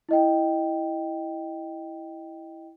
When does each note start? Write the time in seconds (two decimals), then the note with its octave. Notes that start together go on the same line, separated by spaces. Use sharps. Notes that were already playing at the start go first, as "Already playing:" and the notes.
0.09 E4 D#5 G5